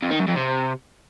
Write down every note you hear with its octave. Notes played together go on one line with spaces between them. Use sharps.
F2
D#3
F#2
F2
C3